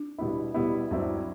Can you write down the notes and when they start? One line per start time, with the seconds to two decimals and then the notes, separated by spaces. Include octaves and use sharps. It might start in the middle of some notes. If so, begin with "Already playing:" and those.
Already playing: D4
0.19 B2 G3 B3 E4
0.54 B2 G3 B3 E4
0.91 G2 F#3 C4 E4